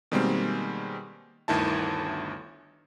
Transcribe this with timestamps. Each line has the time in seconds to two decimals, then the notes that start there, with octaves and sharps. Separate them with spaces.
0.12 B2 D#3 G3 G#3 A#3 C4
1.48 G1 D2 D#3 E4 A5